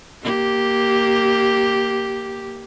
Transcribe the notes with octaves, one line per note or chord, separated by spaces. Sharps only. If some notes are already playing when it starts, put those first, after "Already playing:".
A#3 G4